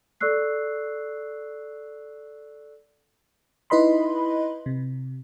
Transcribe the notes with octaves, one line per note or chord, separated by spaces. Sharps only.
A4 D5 C#6 E6 F#6 C7
D#4 E4 B4 D#5 B5 C6
C3